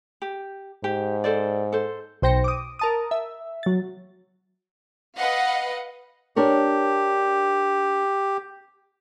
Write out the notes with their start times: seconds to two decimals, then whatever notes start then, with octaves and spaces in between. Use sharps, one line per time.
0.22 G4
0.84 G#2 G4
1.24 A4 C5 D5
1.72 A4 C5
2.22 B1 C5 G5 A#6 C#7
2.44 D6 D#6
2.79 A#4 A5 D#6
3.11 E5
3.63 F#3 A6
5.16 B4 D#5 F5 F#5
6.36 D4 G4 A#4 C#5